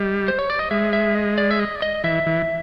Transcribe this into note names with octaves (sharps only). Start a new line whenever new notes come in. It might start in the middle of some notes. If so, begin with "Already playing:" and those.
Already playing: G3 D#5
C5
C#5
D5
D#5
G#3 E5
E5
D#5
D5
E5
D#5
D5
D#5
E3 E5
E3